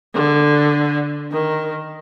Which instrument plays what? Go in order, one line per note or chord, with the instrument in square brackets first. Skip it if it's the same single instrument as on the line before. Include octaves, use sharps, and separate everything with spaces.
[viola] D3
D#3